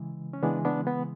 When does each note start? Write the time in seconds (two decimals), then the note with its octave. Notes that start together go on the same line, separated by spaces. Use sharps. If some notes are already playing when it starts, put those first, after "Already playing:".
Already playing: C#3 E3 G#3
0.33 C#4
0.43 C#3 E3 G#3 B3 D4
0.65 B3 D4
0.87 B3